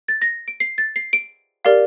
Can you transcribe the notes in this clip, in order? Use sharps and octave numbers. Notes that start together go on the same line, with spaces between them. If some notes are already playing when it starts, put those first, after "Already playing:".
A6
A#6
D7
C7
A6
C7
D7
G4 A#4 D5 F5